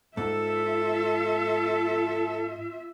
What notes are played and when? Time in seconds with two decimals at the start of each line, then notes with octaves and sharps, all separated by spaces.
0.17 G#2 F4 A4 E5